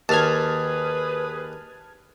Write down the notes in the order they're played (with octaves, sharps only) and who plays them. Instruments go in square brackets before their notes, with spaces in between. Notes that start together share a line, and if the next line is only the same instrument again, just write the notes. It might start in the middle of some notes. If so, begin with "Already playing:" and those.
[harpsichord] D#2 [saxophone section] G#4 B4 [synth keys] A5 F6 G#6